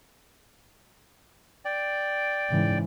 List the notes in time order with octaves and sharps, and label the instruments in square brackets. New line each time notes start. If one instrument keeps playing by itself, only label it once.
[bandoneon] D5 G5
[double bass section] G#2 C#3 E3